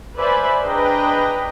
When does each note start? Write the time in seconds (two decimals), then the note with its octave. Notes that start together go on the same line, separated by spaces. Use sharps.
0.16 B4 C5 D5 E5 G#5 B5
0.64 D4 G#4 B4 D#5 G5 A#5